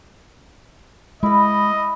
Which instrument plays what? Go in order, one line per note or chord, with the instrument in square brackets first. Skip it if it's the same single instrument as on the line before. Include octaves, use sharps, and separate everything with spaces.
[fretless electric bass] G#3 [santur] E4 B4 [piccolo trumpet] D#5